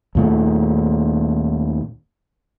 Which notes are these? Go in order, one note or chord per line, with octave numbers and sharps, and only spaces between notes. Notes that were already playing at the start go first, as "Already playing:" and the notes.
D#2 A#2 A3